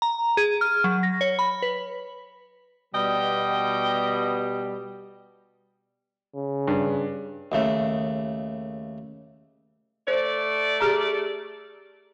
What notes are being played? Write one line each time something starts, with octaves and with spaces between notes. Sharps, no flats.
A#5
G#4
F6
F#3
A#6
C#5
B5
B4
B2 G3 D#5 G5
C#3
G2
D#2 C#3 A3
A3 C5 D5
G4 G#4 A#5